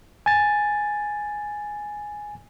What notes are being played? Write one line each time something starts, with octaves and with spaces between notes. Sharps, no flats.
G#5 A6